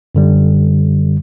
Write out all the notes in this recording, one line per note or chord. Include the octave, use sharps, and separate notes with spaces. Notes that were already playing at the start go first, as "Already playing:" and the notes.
F#2 D3 G3